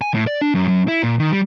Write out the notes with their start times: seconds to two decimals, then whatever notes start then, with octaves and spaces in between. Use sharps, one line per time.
0.01 G#5
0.14 A2
0.27 D5
0.41 D4
0.54 F#2
0.68 F#2
0.88 E4
1.03 A#2
1.19 D#3
1.32 G3